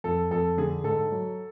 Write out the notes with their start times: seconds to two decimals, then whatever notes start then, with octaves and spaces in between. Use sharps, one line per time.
0.04 F2 A4
0.31 F2 A4
0.57 D3 G#4
0.84 G#2 A4
1.12 F#3